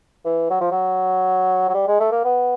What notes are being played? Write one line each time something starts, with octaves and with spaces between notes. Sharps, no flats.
E3
F#3
F3
F#3
F#3
G3
G#3
A3
A#3
B3